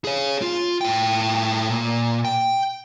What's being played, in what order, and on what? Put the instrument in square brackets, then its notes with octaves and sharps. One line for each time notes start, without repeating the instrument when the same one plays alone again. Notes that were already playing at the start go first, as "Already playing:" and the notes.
[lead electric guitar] G#4 C#5
F4
A2 G5
A#2
G5